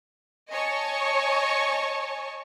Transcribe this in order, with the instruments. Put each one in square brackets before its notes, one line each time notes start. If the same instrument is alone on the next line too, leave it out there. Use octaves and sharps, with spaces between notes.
[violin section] C#5 D#5 G#5 A5 C#6